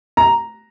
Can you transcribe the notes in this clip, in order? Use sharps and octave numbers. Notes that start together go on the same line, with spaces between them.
A#5